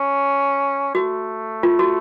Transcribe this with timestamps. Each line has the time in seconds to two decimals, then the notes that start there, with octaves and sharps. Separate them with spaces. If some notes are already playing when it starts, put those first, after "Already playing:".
Already playing: C#4
0.95 A3 F#4
1.63 F4
1.79 F#4